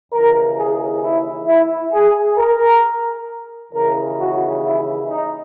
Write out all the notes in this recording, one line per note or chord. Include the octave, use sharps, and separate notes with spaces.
D#2 C#3 E3 A#4
G#4
E4
E4
G#4
A#4
D#2 C#3 E3 A#4
F#4
E4
D#4